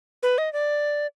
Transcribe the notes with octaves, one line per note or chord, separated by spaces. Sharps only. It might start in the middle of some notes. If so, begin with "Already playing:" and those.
B4
D#5
D5